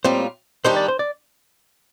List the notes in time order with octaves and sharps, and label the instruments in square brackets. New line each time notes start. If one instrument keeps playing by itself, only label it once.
[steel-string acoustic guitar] A2 G3 A#3 F4 [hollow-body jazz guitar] C4 C5
[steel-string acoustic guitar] D#3 G3 D4 G4 [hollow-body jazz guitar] C5
[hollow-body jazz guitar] D5
C5
D5